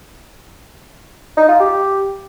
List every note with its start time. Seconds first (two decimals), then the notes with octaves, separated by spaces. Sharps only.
1.37 D#4
1.48 F4
1.60 G4